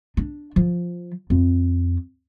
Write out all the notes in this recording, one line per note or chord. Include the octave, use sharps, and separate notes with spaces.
D4
F3
F2